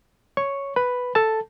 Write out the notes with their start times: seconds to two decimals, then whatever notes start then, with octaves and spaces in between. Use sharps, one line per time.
0.37 C#5 C#6
0.76 B4 B5
1.15 A4 A5